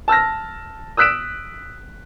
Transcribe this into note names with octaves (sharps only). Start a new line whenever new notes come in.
A5 E6 F6 A#6
D#6 E6 F#6 B6 D7 E7